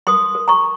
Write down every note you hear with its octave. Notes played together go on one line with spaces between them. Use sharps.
A#4 C6 D#6
A#4
A#5 C#6